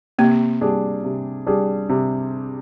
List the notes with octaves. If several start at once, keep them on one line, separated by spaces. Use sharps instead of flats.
C3 A#3
G3 D4 G#4
C3
G3 D4 G#4
C3